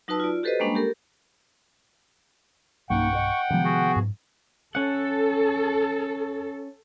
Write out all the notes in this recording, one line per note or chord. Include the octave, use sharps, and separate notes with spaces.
F#3 D#4 F#4 B4 A5 E6
F4 D5
F#4 G4 A4 B4 C5 D#5
G3 G#3 A#3 C#4 D4 B5
G4 A4 A#4
B1 G2 A#3 C#4 D#4 F#5 G5 C#6
C5 D#5
C3 D#3 F3 G#3 B3
F#4 G#4
G#2
C#4 A4 F#5